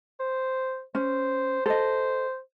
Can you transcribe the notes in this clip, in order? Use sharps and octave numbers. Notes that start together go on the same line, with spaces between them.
C5
C#4 C5
A4 C5 D#5